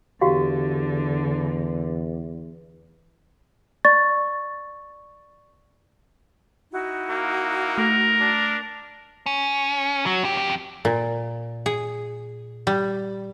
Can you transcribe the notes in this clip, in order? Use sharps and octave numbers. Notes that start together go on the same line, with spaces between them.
E2 D3 F#4 G4 F5
D5 C#6 A6
D#4 E4 F#4
A#3
A3 A#4
D4
C#4
F#3
F2 G4
A#2
G#4
G3